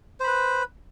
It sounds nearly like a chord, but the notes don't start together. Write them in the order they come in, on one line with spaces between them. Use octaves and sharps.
C5 B5 B4